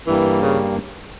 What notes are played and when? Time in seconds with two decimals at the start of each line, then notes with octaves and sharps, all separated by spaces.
0.07 G2 E3 G3 A#3
0.42 C#3